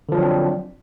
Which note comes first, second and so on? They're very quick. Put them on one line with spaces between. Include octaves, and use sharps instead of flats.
D3 F3 F#3 D4 C4